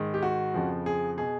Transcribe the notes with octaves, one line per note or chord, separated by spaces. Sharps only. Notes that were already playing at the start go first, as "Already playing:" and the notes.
Already playing: G#2 D#3
G4
F#4
F2 C#3 F3
G#4
B2 G#4